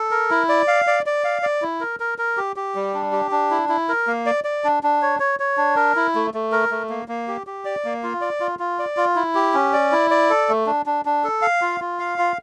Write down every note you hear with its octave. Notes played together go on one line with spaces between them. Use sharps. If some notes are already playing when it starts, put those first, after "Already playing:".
Already playing: A4
A#4
E4
D5
F5
D5
D5
F5
D5
E4
A#4
A#4
A#4
G4
G4
G3
D4
G4
D4
E4
E4
A#4
A#3
D5
D5
D4
D4
C#5
C#5
C#5
D4
A#4
E4
A3
A3
A#4
A3
A#3
A#3
G4
G4
D5
A#3
F4
D5
F4
F4
D5
F4
E4
G4
C#4
D5
E4
D5
A4
A3
D4
D4
D4
A4
F5
F4
F4
F5
F4